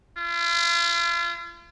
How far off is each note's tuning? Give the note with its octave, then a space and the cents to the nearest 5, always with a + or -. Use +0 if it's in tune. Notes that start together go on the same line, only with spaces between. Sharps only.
F4 -40